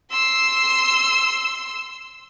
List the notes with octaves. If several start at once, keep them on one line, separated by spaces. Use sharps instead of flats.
C6 E6